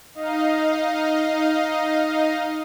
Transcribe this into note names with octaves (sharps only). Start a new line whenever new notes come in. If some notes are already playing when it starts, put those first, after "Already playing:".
D#4 D#5 F5